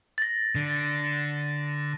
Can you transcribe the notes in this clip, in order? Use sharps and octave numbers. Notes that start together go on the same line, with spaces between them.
A6 A#6
D3